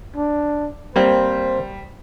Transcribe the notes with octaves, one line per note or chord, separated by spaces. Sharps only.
D4
G3 A#3 C4 C5